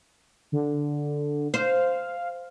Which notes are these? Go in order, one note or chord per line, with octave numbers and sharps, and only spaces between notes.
D3
C5 F5